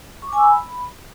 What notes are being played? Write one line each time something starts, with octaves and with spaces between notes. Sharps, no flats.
C#6
D6
G#5
E6
B5